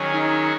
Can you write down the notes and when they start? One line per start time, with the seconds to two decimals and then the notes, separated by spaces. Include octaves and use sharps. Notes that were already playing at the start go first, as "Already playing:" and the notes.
Already playing: D#3 F#3 C#4 G#4
0.12 D#4